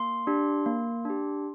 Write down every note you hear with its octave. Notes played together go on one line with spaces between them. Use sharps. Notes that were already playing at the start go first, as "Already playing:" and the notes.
Already playing: A#3 C6
D4 G4
A#3
D4 G4